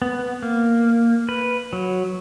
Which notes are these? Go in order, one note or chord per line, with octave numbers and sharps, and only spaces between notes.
B3
A#3
B4
F#3